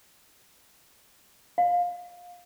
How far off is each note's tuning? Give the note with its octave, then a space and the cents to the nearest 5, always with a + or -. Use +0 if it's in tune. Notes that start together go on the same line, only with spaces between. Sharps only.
F5 +20